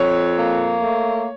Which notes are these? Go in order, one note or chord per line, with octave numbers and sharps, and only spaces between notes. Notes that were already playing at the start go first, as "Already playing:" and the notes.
Already playing: F2 C#5
A#3
A3